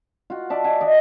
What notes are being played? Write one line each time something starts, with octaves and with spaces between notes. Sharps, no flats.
F4 F#4
D5 E5 A5
E5 F#5 G#5
D5 D#5 F#5